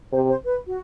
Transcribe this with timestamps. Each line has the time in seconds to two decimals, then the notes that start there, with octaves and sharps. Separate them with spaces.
0.12 C3 C5
0.29 C5
0.44 B4
0.67 F#4